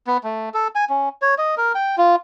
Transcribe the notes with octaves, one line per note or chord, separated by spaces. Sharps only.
B3
A3
A4
G#5
C#4
C#5
D#5
A#4
G5
F4